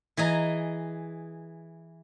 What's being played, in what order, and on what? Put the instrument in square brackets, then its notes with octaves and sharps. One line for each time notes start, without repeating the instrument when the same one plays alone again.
[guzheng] E3 G#4 D#5 A#5